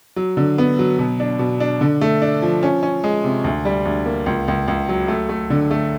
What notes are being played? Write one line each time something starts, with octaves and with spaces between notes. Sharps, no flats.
F#3
D3
B3
F#3
B2
D4
B2
D4
D3
A3
D4
F3
C#4
C#4
G#3
C3
D2
G3
D2
A#3
C#2
C#2
C#2
F#3
A3
A3
D3
A3